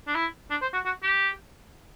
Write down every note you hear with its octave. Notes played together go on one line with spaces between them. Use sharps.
D4
E4
D4
C5
F#4
F#4
G4